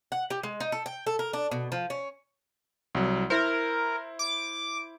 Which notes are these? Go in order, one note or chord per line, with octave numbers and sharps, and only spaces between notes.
F#5
G4
G#3
D#4
A4
G5
A4
A#4
D4
B2
F3
C#4
C2 F#3
E4 A#4 C5
D6